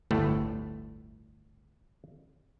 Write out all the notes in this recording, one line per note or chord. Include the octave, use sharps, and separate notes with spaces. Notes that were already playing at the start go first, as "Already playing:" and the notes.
G1 D2 A2 A3